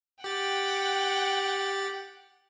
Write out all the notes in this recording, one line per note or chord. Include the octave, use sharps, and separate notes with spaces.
G4 F#5 G5 A6